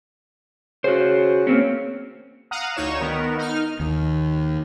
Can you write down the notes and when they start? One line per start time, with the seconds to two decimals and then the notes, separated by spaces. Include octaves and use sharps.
0.84 C#3 F#4 C5
1.47 A#3 C4 C#4
2.51 F5 F#5 A#5 D#6
2.76 D2 D#4 C#5 E7
3.00 D#3 B3 A#4
3.38 D#4 F6
3.80 D#2